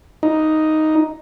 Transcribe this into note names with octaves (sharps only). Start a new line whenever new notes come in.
D#4